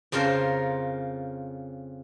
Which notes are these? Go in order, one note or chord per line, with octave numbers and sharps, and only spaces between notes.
F2 C#3 F4 A#4 C5